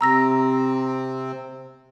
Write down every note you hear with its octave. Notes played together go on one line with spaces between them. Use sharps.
C3 C4 A#5 E6 A#6